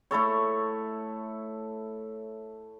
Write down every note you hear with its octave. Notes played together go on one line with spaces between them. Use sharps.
A3 E4 A4 C#5